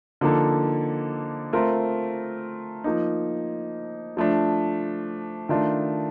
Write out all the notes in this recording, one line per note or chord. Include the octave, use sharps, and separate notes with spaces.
D3 F3 A#3 D#4 A4
A3 C4 F4 A#4
F3 A#3 D#4
F3 A3 D4
D#3 A3 D4 F4